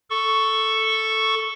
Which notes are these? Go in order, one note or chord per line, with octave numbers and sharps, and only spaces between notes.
A4 C#6